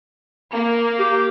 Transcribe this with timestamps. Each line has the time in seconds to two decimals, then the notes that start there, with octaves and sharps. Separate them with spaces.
0.52 A#3
0.99 G4